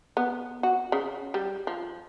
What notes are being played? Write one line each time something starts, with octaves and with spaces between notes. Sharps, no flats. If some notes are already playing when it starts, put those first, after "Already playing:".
B3
F#4
C#3
G3
F3